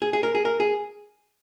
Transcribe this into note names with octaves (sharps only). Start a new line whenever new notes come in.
G#4
G#4
A#4
G#4
A#4
G#4